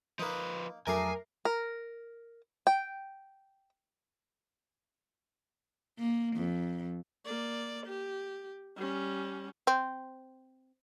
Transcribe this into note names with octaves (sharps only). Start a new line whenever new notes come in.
F3 A#3 D#4 B4
F2 F#3 A3 D4 G#4 A#4 G#5 C7
A#4
G5
A#3
F2
A#3 D5
G4
G3 C#4
C4